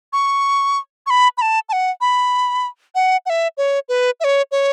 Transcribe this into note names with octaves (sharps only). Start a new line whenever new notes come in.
C#6
C#6
B5
B5
A5
A5
F#5
B5
F#5
F#5
E5
C#5
B4
E5
C#5
C#5